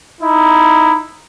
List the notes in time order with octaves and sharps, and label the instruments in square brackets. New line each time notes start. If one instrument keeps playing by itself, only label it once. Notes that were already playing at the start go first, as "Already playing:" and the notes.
[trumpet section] D#4 E4